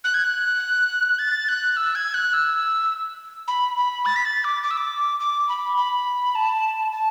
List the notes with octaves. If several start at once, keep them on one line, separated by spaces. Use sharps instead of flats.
F#6
G#6
F#6
A6
F#6
E6
G#6
F#6
E6
B5
B5
A6
B6
A6
D6
D6
E6
D6
D6
B5
B5
A5
A5